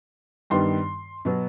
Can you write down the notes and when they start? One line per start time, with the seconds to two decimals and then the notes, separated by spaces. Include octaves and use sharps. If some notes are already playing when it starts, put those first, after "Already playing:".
0.50 G2 D#3 G3 B3 C6
1.25 B2 F#3 B3